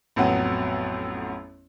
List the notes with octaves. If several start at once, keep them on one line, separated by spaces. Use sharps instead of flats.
A1 F2 F#3 B3